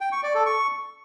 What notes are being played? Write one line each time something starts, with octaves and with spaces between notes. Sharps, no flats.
G5
C#6
D5
A4
C#6